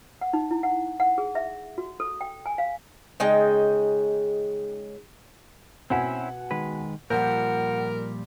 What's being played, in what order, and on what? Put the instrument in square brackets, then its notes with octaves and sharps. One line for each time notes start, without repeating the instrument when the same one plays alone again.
[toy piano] F#5
D#4
E4
F#5
F#5
G#4
E5
F#4
A4
G5
G#5
F5
[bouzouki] C#3 G#3 D#4 G5
[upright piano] B2 F#5 G#5 [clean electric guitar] C4 C#4 E4
[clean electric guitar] D#3 G#3 B4
[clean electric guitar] A#2 F3 G3 [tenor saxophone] A#4 [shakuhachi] F#5 [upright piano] G6